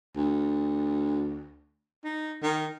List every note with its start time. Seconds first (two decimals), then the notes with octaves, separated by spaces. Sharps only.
0.17 D2
2.04 D#4
2.43 D#3